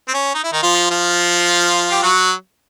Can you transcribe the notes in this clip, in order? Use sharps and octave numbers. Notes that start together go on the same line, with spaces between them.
C4
C#4
D#4
E4
D#3 D#4
F3 F4
F3 F4
G4
F#3 F#4